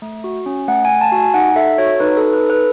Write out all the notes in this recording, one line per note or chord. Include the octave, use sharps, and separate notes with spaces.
A3
F#4
C#4
A3 F#5
G#5
A3
A5
F#4
G#5
D#4 F#5
A4 E5
F#4 C#5
D#4 B4
A4
D#4
B4
A4
B4